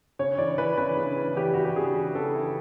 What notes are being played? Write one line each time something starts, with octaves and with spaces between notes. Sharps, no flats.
C#3 C#5
E3 D5
E3 B4
C#3 B4
C#3
E3
E3 G4
E3 F#4
G4
C#3 G#4
E3
C#3 A4
E3